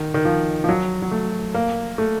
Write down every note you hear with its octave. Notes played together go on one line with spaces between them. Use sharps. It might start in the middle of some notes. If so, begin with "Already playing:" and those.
Already playing: D#3
D#3
F3
F3
F#3
F#3
A3
A#3
A3